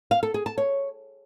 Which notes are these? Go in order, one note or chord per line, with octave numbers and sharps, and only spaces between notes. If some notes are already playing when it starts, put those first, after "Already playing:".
F5
A4
G#4
A5
C#5